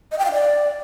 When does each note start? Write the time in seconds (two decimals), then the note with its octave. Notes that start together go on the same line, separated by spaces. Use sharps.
0.12 D#5
0.19 G5
0.25 F5
0.32 D5